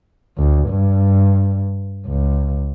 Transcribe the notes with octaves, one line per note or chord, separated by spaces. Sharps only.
D2
G2
C#2